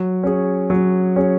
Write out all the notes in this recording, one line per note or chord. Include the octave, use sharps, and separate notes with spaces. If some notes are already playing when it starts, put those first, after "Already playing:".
Already playing: F#3
C#4 G#4
F#3
C#4 G#4